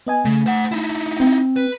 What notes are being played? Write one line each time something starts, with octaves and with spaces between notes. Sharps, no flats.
B3 D#5 G#5
C#3 A3
C5 F#5
D#4 E4
C4
B4